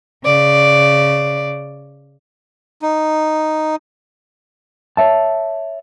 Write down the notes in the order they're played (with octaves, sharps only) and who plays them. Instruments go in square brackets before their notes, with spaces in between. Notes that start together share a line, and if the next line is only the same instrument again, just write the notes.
[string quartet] C#3 D5
[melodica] D#4
[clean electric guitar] C#5 D#5 E5 A5